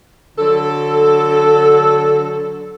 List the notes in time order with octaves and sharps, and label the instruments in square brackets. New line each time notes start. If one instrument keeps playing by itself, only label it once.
[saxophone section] D3 F#3 A4